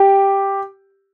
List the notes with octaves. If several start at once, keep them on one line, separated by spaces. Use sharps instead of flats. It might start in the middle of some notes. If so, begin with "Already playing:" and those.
Already playing: G4